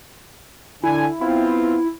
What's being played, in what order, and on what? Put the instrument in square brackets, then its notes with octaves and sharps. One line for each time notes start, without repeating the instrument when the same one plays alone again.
[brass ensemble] D3 G#5 [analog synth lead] E4
[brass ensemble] B3 C4 F4 [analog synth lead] E4